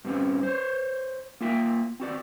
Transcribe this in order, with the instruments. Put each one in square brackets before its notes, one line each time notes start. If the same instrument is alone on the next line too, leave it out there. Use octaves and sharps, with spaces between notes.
[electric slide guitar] G2 C4 C#4
C5 C#5
A#3 F4 E5 G5
C4 F#4 D5